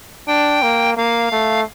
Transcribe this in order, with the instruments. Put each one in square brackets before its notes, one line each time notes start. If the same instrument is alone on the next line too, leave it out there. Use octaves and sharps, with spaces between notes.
[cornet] D4 [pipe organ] G5
[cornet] A#3
[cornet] A#3 [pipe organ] F5
[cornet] A3